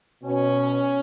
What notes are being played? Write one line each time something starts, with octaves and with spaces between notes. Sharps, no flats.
B2 C#4